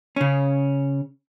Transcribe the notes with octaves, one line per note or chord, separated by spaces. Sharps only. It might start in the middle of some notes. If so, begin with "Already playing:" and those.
C#3 C#4